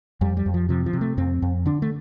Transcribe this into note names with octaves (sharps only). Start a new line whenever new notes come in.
F2 G3
G3
F2
F3
C3 F3
F3
C3
A3
F2 C4
F2
D3 D4
A3